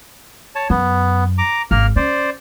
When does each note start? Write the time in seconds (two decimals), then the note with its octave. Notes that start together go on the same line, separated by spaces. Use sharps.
0.55 C#5 A5
0.70 F#2 B3
1.38 A#5 D6
1.71 G#1 A#3 A#4 F6
1.96 C#4 C5 D5